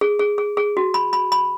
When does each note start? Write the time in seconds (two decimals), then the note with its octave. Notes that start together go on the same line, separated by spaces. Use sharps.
0.01 G#4
0.19 G#4
0.38 G#4
0.57 G#4
0.77 F#4
0.94 B5
1.13 B5
1.32 B5